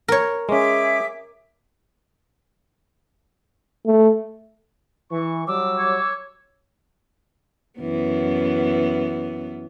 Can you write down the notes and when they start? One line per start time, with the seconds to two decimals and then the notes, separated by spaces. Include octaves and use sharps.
0.08 A#4 C#5
0.49 G#3 C#4 G#4 E5 D6
3.86 A3
5.11 E3 C#6
5.47 F#3 G3 D6 E6
5.78 C#5
7.79 F#2 E3 B3